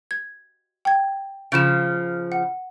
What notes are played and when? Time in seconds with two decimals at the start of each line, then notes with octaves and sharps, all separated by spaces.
0.11 G#6
0.85 G5 G#6
1.52 C#3 F3 D7 E7
2.32 F#5